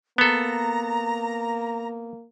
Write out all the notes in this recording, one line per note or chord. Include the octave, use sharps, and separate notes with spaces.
A#3 B3 A4 A#5